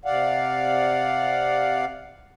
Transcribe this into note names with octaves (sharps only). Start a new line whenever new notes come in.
C3 D5 F5 F#5